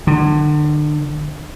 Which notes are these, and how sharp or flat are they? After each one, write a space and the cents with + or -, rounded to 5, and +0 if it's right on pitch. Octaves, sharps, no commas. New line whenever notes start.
D3 +35